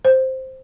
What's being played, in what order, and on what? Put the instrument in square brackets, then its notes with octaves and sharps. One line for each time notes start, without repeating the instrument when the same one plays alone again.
[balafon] C5